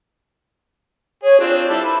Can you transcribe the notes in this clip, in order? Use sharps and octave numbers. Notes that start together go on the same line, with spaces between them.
G#4 C#5
C4 D4 F4
G3 E4 A4
B4